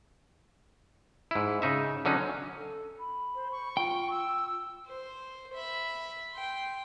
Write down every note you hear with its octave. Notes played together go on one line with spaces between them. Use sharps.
G#2 E4
C#3 D#4 E5
D3 F#3 C#4 D#4
A4
B5
C5
C#6
F4 G5
E6
C5
E5 B5
G5 C6